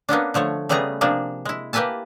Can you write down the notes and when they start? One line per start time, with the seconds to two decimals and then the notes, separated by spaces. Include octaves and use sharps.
0.09 A#3 B3 C#4 D4
0.34 D3 F3 A3 C#5
0.69 C#3 G3 A3 B3 G#4 A#5
1.01 C3 F3 A#3 D4 G#4
1.45 G#3 E4
1.73 A#3 G4 B4 E5 G#5 A5